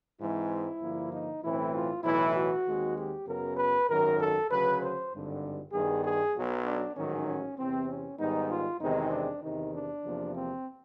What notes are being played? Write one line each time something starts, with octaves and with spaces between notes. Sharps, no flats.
G#2 E3 G#3 C4 E4
G2 D3 F3 A#3
D#4
B1 A2 E3 A3 C4 E4
F4
B1 A2 E3 E4
F#4
D#2 D#3 G#3 C4
G4
F#2 C#3 F#3 B3 A#4
B4
G#1 F#2 D#3 A#4
A4
D2 C#3 F#3 B4
C5
G#1 G2 D3
G2 D#3 G3 B3 G#4
G#4
B1 B2 F#3
D4
A1 G#2 D#3 F#3 C#4
C#4
E2 C3 E3 C4
C#4
G#2 D#3 G3 B3 D#4
F4
E2 C3 D#3 G#3 C4 D#4
D4
E2 C3 D#3 D#4
D4
E2 C3 F3 A#3
C4